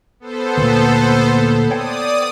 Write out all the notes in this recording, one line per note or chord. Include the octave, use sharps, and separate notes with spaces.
B3 A4 C5
D2 A#2
C#5 D5 G5 D#6